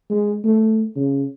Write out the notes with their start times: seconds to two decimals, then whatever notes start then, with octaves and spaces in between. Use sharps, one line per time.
0.10 G#3
0.44 A3
0.96 C#3